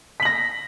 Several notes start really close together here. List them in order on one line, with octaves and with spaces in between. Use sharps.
B6 F#7 A#6